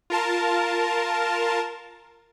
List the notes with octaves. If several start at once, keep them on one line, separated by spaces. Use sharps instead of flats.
F4 A#4 A5